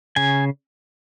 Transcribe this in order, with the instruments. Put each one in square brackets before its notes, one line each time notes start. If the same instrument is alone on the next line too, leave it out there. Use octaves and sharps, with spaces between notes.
[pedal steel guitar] C#3 G#5